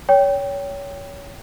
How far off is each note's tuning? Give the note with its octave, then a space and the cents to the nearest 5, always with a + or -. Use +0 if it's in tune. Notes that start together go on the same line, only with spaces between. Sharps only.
C#5 +25 G5 +0